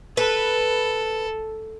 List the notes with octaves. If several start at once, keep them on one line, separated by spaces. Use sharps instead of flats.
A4 B4